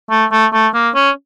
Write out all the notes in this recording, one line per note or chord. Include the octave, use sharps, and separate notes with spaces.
A3
A3
A3
A#3
C#4